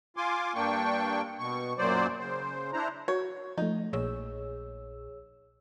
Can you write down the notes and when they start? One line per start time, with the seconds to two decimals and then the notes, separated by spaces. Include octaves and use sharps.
0.17 F4 G#5 C6 D6
0.55 G2 A#3 D4 G5 C#6
1.39 B2 C#6
1.78 F#2 A#2 F#3 C5 D5
2.19 C#3 C5
2.73 D4 E4 C5 A#5
3.08 F#4 C#5
3.58 F3 A3 D#4
3.93 A#1 G#4 C#5 E6